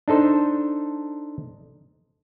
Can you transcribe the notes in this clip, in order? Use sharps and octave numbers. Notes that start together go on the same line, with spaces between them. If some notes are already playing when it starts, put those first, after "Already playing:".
D4 D#4 A4 C5